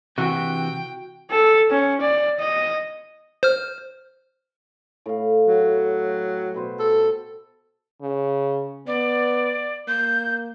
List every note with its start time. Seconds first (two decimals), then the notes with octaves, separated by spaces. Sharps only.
0.18 C3 E3 F#4 G5
1.31 A4
1.70 C#4
2.01 D5
2.39 D#5
3.43 C5 F6
5.06 A2 F5
5.48 F#3
6.09 G5
6.54 B2 B4 C5
6.79 A4
8.02 C#3
8.87 B3 D5
9.88 A#3 G6